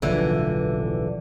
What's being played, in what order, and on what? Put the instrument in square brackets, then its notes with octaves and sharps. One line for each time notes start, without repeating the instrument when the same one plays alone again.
[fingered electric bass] D1 B1 F3 [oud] D3 E3